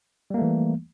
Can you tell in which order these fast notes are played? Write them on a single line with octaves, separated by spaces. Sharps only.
G3 A#3 A3 E3